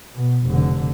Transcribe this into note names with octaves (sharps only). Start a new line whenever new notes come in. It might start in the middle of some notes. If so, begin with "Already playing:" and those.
B2
F1 D3